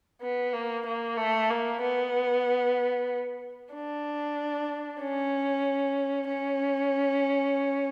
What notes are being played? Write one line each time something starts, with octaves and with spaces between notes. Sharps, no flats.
B3
A#3
A#3
A3
A#3
B3
D4
C#4
C#4